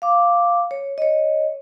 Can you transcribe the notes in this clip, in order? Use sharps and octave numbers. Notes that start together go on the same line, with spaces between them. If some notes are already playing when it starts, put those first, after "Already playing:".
F5 D6
C#5
C#5 D#5